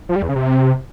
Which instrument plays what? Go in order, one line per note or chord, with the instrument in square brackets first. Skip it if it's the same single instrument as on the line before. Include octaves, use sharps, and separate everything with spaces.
[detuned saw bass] F3
G3
E2
C#3
C3